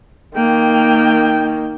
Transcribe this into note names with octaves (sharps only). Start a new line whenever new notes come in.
D#3 A#3 G5